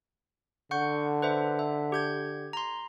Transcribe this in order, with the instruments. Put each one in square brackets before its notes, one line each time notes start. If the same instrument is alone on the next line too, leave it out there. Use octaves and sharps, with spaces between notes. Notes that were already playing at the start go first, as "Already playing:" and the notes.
[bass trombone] D3 [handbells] F#5 C#6 G6
[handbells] B4 C5 E5
E5
G4 G6 G#6
A#5 C6